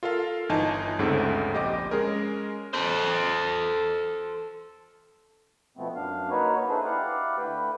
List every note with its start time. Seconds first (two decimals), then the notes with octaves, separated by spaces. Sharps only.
0.03 F4 A4 A#4 F5
0.49 G1 E3 D#4 G#5 A5
0.99 G1 D2 G#2 C#3 C4 A4
1.54 A#1 G4 D#5 D6
1.91 G#3 C#4 G#4 A#4
2.73 A4 C5
5.77 B2 F3 A3 B3 C4
5.95 F#2 D4 F5
6.30 A#3 D#4 F#4 B4 C#5
6.69 D4 E4 G#4 A4 B4 C5
6.85 E4 G4 D5 F5 F#5
7.37 D3 A3 B4 G5